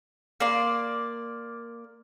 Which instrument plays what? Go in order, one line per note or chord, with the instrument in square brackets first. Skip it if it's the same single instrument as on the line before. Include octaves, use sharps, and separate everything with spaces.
[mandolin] A#3 D5 C6